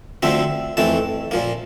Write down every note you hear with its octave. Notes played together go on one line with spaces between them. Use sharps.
D2 D3 F3 C4 E5
F2 E3 A3 C4 A5
A#2 F3 A#3